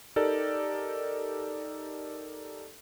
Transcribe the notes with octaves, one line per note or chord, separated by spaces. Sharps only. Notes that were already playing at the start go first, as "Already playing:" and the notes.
D#4 G4 A4 A#4 D5